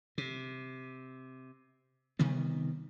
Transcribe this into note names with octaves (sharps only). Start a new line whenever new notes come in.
C3
C3 D#3 G3 B3